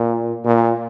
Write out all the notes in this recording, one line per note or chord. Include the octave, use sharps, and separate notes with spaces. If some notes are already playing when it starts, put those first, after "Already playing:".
Already playing: A#2
A#2